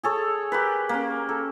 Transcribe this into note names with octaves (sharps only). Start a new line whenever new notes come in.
G#4 A4 C#5
G4 A#4 B4
A#3 C#4
A4